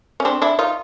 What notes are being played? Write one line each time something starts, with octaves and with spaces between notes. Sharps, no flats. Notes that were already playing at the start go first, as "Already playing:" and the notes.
C#4
C4 D4
D4 E4
D#4 F4